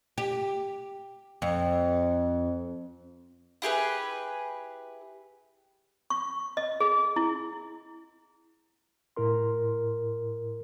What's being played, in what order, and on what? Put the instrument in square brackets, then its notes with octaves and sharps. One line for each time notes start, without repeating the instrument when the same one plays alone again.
[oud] G4
F2
[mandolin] E4 G4 G#4 B4
[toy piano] C#6
D#5
G#4
E4
[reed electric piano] A2 E4 A#4 C6